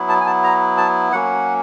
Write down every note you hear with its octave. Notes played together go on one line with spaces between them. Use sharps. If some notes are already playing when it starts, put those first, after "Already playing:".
Already playing: F#3 B3 E4
A5
G#5
A5
A#5
A5
F#3 A#3 C#4 F#5